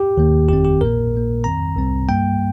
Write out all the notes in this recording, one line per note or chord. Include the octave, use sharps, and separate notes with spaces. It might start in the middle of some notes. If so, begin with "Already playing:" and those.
Already playing: G4
D#2 D#3 A#3
G1 F2 D#3 C4 G4
G4
A#1 A#2 A#3 A#4
A#1 A#2 A#3
F2 D#3 C4 A#5
C2 C3 G3 C4
G2 G3 A#3 G5